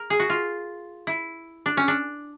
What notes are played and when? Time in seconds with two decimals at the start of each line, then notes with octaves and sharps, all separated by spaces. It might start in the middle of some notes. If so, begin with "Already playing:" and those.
Already playing: A#4
0.10 G#4
0.20 F#4
0.30 F4
1.07 E4
1.66 D4
1.77 C#4
1.88 D4